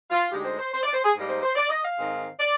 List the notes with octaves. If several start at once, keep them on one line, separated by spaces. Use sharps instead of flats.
F4
D2 D3 G#3 D#4 G4
C5
C5
C5
D5
C5
G#4
G#2 G3 A#3 D#4
C5
C5
D5
D#5
F5
G#2 D#3 G#3 C4
D5